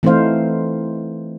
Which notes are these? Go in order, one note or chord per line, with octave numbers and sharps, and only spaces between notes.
E3 A3 C4 D#4 C5 F5